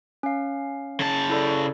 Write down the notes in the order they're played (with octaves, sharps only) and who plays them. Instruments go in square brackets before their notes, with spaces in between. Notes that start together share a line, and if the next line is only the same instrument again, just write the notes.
[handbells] C#4 F5
[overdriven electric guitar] C#3 A5
[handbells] E4 A4 D5